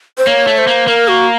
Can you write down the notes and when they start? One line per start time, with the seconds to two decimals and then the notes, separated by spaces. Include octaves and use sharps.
0.18 C5
0.27 A#3 C#5
0.47 A3
0.58 C5
0.67 A#3
0.87 A#3 A#4
1.08 F#4